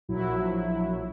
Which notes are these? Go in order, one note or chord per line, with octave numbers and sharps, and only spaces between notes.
A#1 F#3 E4